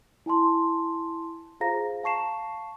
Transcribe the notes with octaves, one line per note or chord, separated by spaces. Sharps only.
E4 G#5 A5 C6
F4 G#4 C5 F5 A#5 A#6
F5 A5 C#6 C7 E7